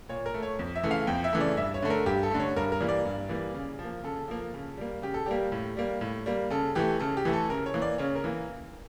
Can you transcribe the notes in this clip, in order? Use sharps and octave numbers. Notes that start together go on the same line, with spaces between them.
A#2 C#5
A#4
A3
C#5
F2
E5
C#3 E3 A3
F5
F2 G5
E5
C#3 E3 A3
D5
G2 E5
C#5
D3 A3
A#4
G2 G4
A4
D3 A3
C#5
G2 A#4
A#4
E3 G3 A#3
D5
G2
E3 G3 A#3
C#3
F3
A#3
C#3 A4
F3 A#3
C#3
G3 A#3
C#3 G4
A4
G3 A#3 G4
A2
G3 A#3
A2
G3 A#3
C#3 A4
E3 A3 G4
C#3 A4
G4
E3 A3
A4
C#3 A#4
C#5
E3 A#3
D5
C#3 C#5
A#4
E3 A#3